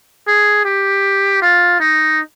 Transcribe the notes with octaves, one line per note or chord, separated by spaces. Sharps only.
G#4
G4
F4
D#4